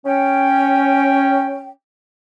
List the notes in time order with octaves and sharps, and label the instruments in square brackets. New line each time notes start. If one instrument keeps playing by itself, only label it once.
[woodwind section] C#4 G5